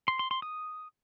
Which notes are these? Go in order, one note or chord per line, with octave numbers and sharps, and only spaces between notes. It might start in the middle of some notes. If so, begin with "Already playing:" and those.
C6
C6
C6
D#6